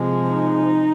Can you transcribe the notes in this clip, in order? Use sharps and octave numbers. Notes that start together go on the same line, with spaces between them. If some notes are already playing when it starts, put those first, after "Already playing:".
Already playing: C3 F3 G#3
D#4